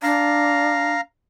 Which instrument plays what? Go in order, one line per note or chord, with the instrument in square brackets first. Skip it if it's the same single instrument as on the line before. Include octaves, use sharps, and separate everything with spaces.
[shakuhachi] D4 [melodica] F5 A#5